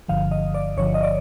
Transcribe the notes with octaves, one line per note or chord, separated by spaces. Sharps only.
G1 G2 D3 F3 F5
D#5
D5
G1 G2 D3 F3 C#5
D#5
D5